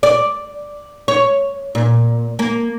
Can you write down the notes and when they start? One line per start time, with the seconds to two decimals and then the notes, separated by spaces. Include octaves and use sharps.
0.03 D5
1.08 C#5
1.75 A#2
2.39 A#3